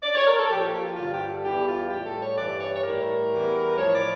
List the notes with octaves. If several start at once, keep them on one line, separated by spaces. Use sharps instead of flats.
D5
C#5
A#4
A4
A#2 F3 G4
F4
G4
F4
G2 D3 G3 F4
G4
A4
E2 E3 G3 G4
F4
A2 G3 G4
A4
C#5
G2 E3 G3 D5
C#5
C#5
A2 G3 A#4
E2 E3 G3
A2 F3 C#5
D5